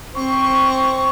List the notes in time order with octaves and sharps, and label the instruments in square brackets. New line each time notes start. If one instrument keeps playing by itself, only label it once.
[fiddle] C4 [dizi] C#6